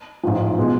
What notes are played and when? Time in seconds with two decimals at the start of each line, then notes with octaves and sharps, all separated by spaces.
0.23 A1 G#2 F3
0.58 B2 G#3